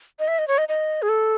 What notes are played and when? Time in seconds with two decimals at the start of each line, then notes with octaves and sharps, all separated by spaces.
0.19 D#5
0.28 E5
0.39 D#5
0.48 C#5
0.58 D#5
0.69 D#5
1.02 G#4
1.09 A4